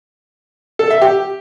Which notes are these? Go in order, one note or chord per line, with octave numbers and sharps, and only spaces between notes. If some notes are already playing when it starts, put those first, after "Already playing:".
A4
E5
G4